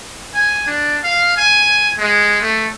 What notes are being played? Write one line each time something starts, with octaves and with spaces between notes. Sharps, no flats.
G#5
D4
F5
G#5
G#3
A3